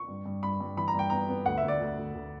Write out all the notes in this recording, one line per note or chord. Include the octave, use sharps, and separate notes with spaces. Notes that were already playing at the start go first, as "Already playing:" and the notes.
Already playing: C#6
G2
G2
G2 B5
G2
E3 B5
A#5
G2 G5
B3 A#5
B3
D2 F#5
E5
D2
D5
D2
D2
D2